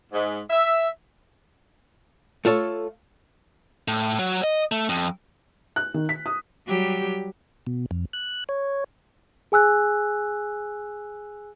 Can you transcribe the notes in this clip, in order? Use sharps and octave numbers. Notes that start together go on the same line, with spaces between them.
G#2
E5
A3 F4 A4 C#5
A2
F#3
D#5
A3
F2
F#6
D#3
B6
D#6
F#3 G3 G4
B2
F2
F#6
C#5
G#4 G#5 E6 F#6